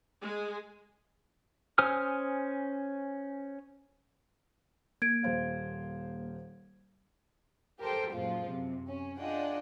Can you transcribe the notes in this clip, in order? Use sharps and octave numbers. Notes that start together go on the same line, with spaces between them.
G#3
C#4 C5 G#5 D#6 F6
A#3 G#6 D7
D#1 C5 F5
G4 A4 A#4 C5 G5
F#2 A#2 F3 G#3 F4
F#2 C3
C#4
D4 F4 G#4 D#5 F#5 G5